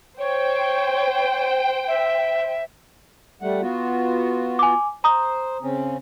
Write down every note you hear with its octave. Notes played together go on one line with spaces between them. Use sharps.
C5 C#5 G5
E5
G3 A3 F#5
B3 F4 F#4
G#5 D6
C5 A#5 D#6
C#3 C4 C#4